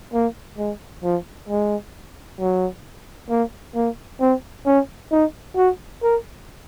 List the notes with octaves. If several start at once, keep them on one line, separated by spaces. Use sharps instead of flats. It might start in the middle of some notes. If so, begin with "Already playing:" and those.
A#3
G#3
F3
G#3
F#3
A#3
A#3
C4
C#4
D#4
F#4
A#4